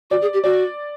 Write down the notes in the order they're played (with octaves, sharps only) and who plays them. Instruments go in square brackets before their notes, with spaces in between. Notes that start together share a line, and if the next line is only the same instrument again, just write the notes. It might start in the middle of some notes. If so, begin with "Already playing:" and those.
[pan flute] F#4 [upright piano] D5
[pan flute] G#4
G4
[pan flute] F#4 [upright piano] D5